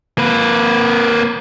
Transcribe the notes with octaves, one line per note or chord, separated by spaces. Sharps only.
A#3 B4